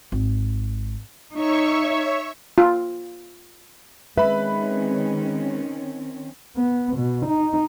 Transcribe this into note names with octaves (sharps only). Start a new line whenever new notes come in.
G#1
D#4 C#5 E5 C#6
F4
D#3 G#3 C4 C#4 B4 E5 B5
B3
B2
D#4